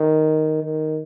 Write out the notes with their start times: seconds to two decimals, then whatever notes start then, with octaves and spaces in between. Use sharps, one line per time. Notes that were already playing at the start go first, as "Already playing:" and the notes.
Already playing: D#3
0.63 D#3